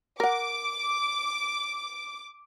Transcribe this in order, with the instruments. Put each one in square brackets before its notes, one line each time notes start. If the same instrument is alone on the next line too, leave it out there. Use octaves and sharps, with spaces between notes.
[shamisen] A#4 F#5 [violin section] D6